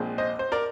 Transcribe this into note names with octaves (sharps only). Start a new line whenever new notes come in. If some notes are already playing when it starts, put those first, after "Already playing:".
Already playing: A#1 A#2 G#3 C4
C5 D#5
C5
A#4 D5